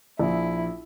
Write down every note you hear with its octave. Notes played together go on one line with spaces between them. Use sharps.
A#1 E4